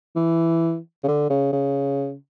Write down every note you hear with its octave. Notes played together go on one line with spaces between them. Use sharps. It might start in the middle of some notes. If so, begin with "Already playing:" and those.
E3
C#3
D3
C#3
C#3